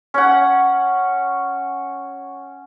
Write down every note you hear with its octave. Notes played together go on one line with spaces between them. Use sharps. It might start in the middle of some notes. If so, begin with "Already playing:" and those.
C#4 F#5